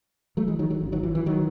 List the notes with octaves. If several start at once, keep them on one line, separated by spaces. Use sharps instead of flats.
F#3 A3
E3 G#3
D#3 F#3
D#3 F#3
G#1 F#2 C#3
D#3 F#3
E3
E3
D#3 F#3